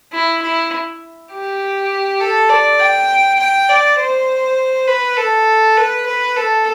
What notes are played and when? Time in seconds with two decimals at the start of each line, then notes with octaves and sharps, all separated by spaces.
0.12 E4
0.42 E4
1.31 G4
2.20 A4
2.49 D5
2.80 G5
3.39 G5
3.69 D5
3.98 C5
4.87 B4
5.17 A4
5.77 B4
6.06 B4
6.36 A4